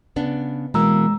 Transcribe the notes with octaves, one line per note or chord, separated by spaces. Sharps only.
C#3 B3 D4
B2 E3 G#3 A#3 A#5 E6